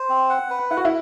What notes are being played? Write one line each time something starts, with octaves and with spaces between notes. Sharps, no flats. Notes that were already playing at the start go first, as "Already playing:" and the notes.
Already playing: C5
C4
F#5
B4
E4 F#5
F#4
E4